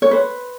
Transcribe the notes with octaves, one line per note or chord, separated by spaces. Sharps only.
C#5
B4 C5